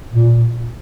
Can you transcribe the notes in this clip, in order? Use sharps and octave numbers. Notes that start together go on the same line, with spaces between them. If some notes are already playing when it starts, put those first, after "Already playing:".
A#2